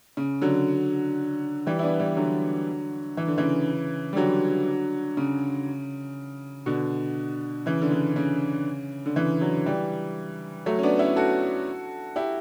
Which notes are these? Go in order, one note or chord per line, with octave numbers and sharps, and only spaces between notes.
C#3
D3 F#3
E3 G3
E4
B3 D4
E3 G3
D3 F#3
E3
D3
C#3 E3
G3
D3 F#3
C#3
B2 D3
C#3 E3
D3
C#3
C#3
D3
C#3 E3
D3 F#3
E3 G3
F#3 A3
C#4
B3 D4
C#4 E4
F#4 A4
E4 G4